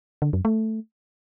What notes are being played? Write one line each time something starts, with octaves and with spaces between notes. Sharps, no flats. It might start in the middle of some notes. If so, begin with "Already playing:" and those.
D3
F#2
A3